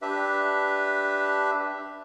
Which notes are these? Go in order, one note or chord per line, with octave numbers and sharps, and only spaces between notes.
D4 G4 B4 E5